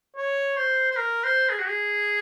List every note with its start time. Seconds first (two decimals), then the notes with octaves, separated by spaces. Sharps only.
0.17 C#5
0.57 C5
0.91 C5
0.97 A#4
1.24 C5
1.50 G#4
1.59 F#4
1.67 G#4